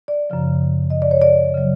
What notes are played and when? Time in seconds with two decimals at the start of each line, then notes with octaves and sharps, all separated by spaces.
0.08 D5
0.30 F#2 C#3 F3
0.90 D#5
1.02 D5
1.11 C#5
1.22 D5
1.54 C#3 F#3